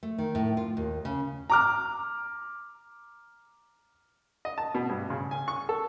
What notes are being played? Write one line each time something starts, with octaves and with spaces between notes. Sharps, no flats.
A3
D#3
A2
F4
D#2
C#3
A#5 D6 F6
D#5
A5
B2
G2
C#3
G#5
C#6
A4